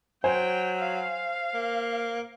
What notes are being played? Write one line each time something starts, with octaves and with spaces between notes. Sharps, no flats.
F#3 C5 G5 G#5
F5
A#3